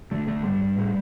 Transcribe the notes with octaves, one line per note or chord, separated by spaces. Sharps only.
D3 A3
D3 A3
G2 G3
G2
A2